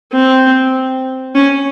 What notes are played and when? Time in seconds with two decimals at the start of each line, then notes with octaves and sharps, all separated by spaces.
0.12 C4
1.35 C#4